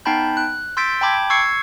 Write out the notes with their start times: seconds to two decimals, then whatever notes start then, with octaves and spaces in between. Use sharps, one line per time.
0.05 B3 D#4 G5 A5 B5 G6
0.37 F#6
0.77 C6 E6 G6 A6 B6 D7
1.01 G5 A5 B5 D6 G6 G#6
1.30 C#6 E6 G#6 C7 C#7